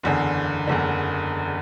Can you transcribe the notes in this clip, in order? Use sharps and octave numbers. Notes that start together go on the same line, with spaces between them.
F#1 E2 D3
F#1 E2 D3